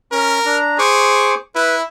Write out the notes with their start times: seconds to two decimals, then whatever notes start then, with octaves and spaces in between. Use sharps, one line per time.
0.12 C#4 A#4
0.45 D4 A#5
0.79 G#4 C5 C#6 D6
1.55 E4 B4